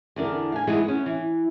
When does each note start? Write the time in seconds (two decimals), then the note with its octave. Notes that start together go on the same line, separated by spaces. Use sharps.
0.16 E2 D3 D4 A#4
0.52 F5 G#5
0.67 E3 G#3 B3 D#4 G#4
0.85 B3 C#4
1.06 E3